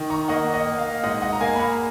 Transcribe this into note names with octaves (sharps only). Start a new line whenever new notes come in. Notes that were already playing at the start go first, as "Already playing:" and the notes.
Already playing: D#3
A#5 C#6
A#3 D#5 F#5
D#5 F#5
A#3
F5
G#2 D#5 F#5
D#5 F#5
A#5
A#3 F5 G#5
B5
F#5 A#5